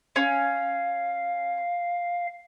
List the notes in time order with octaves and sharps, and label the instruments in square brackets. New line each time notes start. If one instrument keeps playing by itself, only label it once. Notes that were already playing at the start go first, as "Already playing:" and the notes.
[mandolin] C#4 [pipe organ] F5